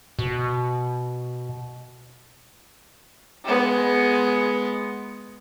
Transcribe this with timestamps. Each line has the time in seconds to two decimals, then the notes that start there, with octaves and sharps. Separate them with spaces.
0.19 B2
3.45 G#3 B3